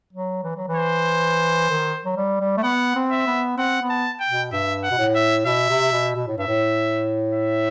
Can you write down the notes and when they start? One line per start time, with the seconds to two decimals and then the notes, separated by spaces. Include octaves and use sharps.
0.13 F#3
0.44 E3
0.57 F#3
0.68 E3
0.76 C5
1.70 D#3
2.05 F#3
2.17 G3
2.40 G3
2.57 A3
2.63 B3 F#5
2.95 C4
3.11 E5
3.27 B3
3.57 C4 F#5
3.82 B3
3.90 A5
4.20 G5
4.28 B2
4.52 G2 E5
4.83 F#5
4.91 B2
4.99 A2
5.15 E5
5.46 B2 E5
5.70 C3
5.92 B2
6.16 B2
6.27 A2
6.37 G2 E5
6.47 A2
7.34 E5